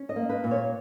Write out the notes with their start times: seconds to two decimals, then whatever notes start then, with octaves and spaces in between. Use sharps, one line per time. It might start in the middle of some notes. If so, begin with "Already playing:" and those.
Already playing: C#4
0.09 D#5
0.16 A#3
0.29 B4
0.44 A#2
0.51 C#5